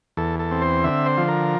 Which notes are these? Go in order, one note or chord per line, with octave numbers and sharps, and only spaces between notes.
E2 A4
A4
C4
C5
D3 E5
C5
F3
A#4